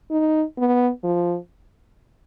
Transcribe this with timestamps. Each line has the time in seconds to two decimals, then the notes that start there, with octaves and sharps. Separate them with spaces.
0.11 D#4
0.58 B3
1.04 F3